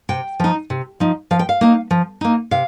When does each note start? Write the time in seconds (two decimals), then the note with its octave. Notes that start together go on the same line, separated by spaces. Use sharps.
0.09 C3 G5
0.40 F3 D#4
0.70 C3
1.00 F3 D#4
1.31 F3 F5
1.39 G5
1.49 F5
1.61 A#3 D#4
1.91 F3
2.21 A#3 D#4
2.51 C3 F5